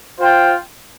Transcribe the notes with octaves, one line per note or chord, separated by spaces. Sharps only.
F4 C5 G5